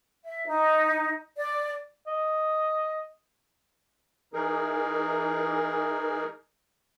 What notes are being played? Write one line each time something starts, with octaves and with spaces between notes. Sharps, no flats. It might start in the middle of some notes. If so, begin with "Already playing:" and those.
E5
D#4
D5
D#5
E3 D#4 G#4 A#4